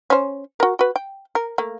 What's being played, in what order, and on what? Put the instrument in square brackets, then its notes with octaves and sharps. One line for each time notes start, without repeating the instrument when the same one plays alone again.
[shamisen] C#4 C5
F#4 A#4
F#4 B4
G5
A#4
A3 A#3